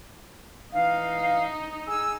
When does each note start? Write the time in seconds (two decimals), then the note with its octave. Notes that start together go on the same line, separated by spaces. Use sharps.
0.73 E3 D#4 F5
1.88 G#4 G#5 E6